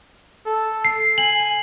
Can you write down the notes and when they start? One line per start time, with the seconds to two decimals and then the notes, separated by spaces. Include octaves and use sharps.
0.46 A4
0.85 C7
1.18 G#5 F#7